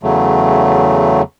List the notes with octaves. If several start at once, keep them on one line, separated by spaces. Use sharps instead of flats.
E2 C#3 F#3 A3